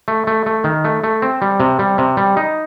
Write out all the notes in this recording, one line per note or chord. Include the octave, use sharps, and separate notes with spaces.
A3
A3
A3
D#3
A3
A3
C4
G3
C3
G3
C3
G3
D#4